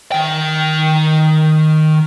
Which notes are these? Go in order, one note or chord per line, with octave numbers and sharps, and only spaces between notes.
D#3 G5